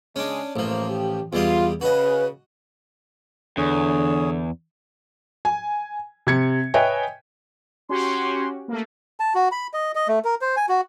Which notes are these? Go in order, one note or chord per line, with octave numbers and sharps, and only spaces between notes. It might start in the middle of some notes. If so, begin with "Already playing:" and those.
C#3 G#3 C#4 D4
A1 F3 A#3 C5
G4
E2 G3 F4 D#5
C#3 F#4 B4 D#5
E2 D3 G#4 C#5
G#5
C3 G#6 C#7
B4 C#5 D#5 E5 G5 G#5
C#4 F#4 G4 C6
A3 A#3
A5
F#4
B5
D#5
D#5
A3
A#4
C5
G#5
F#4